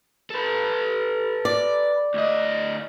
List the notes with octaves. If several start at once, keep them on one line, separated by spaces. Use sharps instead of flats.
A4 B4
D5
D2 D#5